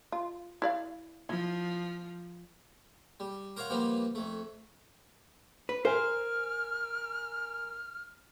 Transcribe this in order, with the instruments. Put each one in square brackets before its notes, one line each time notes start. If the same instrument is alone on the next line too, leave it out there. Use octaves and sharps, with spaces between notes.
[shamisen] F4
E4 D5 F5
[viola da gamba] F3 [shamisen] E4
[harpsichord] G3
A#4 C5 C#5 F5 F#5
F3 G3 A#3 B3 D#4 F4
F2 A3
[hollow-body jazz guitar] B4
[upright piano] A#4 G#5 [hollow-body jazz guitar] C5 [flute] F6